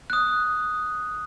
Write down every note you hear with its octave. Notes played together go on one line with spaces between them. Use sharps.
D#6 F#6